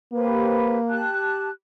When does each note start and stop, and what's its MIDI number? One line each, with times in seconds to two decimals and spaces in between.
0.13 1.07 58
0.13 0.78 67
0.13 0.78 71
0.13 0.78 72
0.89 1.49 67
0.89 1.49 81
0.89 1.49 90